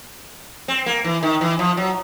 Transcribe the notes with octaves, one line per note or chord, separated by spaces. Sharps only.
C4
A#3
E3
D#3
E3
F3
F#3